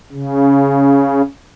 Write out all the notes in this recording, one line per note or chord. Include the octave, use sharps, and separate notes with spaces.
C#3